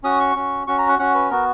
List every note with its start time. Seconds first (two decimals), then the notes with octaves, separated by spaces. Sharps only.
0.04 C#4 F#4 D#6
0.20 C#6
0.36 C#4 F#4
0.67 C#4 F#4 C#6
0.78 A#5
0.89 F#5
0.99 C#4 F#4 F#5
1.15 B4
1.30 B3 F#4 A#4